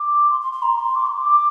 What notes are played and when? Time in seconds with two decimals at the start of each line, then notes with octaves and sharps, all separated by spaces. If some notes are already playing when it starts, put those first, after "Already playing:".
Already playing: D6
0.31 C6
0.41 C6
0.52 C6
0.63 A#5
0.80 C6
0.95 D6
1.06 C6
1.17 D6